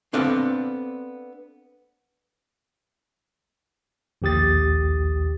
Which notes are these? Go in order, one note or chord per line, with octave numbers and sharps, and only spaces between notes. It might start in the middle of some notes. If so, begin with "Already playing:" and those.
B3 C4 D4 A4 F5
A#1 D#2 G4 D#6 A6